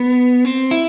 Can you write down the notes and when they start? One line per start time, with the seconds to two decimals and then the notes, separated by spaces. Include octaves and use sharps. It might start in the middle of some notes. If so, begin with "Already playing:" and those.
Already playing: B3
0.45 C4
0.71 E4